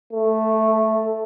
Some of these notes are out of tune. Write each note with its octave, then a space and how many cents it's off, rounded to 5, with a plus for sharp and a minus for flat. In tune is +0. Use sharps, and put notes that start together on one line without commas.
A3 +0